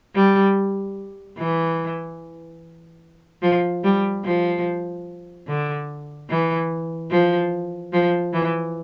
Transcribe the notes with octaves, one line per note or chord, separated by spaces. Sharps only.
G3
E3
F3
G3
F3
D3
E3
F3
F3
E3